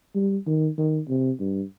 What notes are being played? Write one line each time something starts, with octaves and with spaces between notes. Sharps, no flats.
G3
D#3
D#3
C3
G2